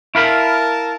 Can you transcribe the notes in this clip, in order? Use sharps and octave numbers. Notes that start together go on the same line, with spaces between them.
E4 A#4 F5 A5 B5